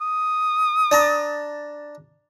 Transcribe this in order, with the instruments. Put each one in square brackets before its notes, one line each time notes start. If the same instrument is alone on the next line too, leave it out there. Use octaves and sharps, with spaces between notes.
[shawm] D#6
[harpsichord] D4 A5 A#5